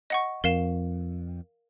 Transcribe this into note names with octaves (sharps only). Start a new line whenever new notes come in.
D#5 F#5 C#6
F2 A#4 F5 E7